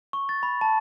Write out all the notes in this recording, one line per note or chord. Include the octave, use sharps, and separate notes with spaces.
C#6
A6
B5
A5